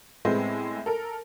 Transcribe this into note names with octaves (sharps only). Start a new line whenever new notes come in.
A2 G#3 A3 B3 C4 E4
A4 A#4